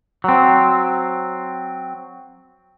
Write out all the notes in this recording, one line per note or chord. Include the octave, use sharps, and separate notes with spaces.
F#3 C4